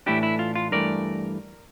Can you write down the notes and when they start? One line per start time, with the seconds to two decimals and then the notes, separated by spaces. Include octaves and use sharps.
0.06 A2 E3 A3 D4 E4 G4
0.23 E4
0.39 F4
0.56 F4
0.71 G2 E3 A3 A#4 D5